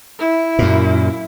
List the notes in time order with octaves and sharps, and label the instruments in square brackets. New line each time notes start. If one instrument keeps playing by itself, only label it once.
[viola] E4
[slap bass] F#2 A#2